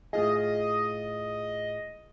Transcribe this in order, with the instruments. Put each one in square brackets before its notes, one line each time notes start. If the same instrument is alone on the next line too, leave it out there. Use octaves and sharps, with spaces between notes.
[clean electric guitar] A2 F4 G#4 [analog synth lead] D#5